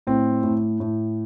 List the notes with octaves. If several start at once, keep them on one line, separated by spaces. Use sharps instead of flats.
A2 C4
A2
A2